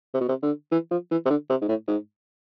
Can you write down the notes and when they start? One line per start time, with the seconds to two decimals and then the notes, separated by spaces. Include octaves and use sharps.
0.14 C3
0.21 B2
0.29 C3
0.42 D3
0.72 E3
0.91 F3
1.11 E3
1.26 C3
1.30 D3
1.50 C3
1.62 G#2
1.68 A2
1.88 G#2